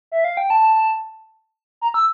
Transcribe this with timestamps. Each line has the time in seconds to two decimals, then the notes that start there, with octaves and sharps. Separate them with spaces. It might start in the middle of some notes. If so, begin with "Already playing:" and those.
0.12 E5
0.24 F5
0.37 G5
0.50 A5
1.81 A#5
1.94 E6